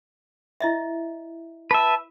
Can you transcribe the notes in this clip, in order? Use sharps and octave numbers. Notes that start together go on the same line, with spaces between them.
E4 D#5 E5
B4 E5 A5